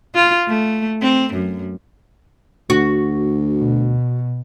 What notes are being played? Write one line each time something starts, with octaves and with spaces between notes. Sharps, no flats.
F4
A3
C4
F#2
D2 F#4
B2